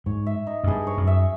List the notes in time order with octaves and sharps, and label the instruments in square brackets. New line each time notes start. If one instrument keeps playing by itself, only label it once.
[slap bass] G#2 [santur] C#5
[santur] E5
D#4
[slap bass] F#2
[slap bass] G2 [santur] G#4
[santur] C#5
[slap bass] F#2
[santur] E5